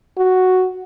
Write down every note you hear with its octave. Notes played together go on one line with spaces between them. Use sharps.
F#4